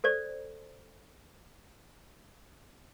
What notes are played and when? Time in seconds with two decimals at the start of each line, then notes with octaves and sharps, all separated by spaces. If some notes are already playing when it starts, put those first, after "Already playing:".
0.04 A4 C5 D5